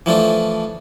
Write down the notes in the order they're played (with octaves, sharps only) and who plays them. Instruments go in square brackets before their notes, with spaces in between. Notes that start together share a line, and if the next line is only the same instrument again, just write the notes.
[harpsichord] E3 F3 A3 D4